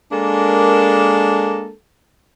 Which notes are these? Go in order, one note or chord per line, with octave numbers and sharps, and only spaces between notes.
G#3 A#3 D4 A4 A#4